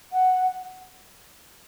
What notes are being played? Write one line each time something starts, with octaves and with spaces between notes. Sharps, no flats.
F#5